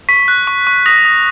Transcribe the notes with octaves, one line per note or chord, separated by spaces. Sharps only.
C#6 B6
F#6
C#6
C#6
D#6 A#6
D#6